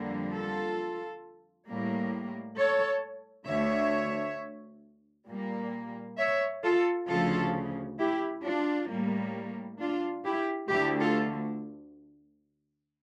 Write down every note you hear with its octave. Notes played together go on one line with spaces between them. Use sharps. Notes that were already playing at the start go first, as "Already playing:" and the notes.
Already playing: F2 D3 G3 A#3
F4 A4
A2 G3 A#3
A4 C#5
D2 D3 A3 C#5 E5
A#2 G3 A#3
C#5 E5
F4 A4
D2 C#3 F3 F4 A4
E4 G4
D4 F4
A2 G3 A#3
D4 F4
E4 G4
D2 D3 A3 E4 G4
F4 A4